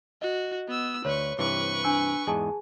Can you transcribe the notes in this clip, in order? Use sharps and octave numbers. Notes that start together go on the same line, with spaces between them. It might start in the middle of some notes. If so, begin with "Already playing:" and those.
F#4 D#5
B3 E6
D2 B4 C#5 C#6
G2 C3 E3 B4 C#6
D4 G#5 E6
E2 G#2 G#4 D#5 G#5 A5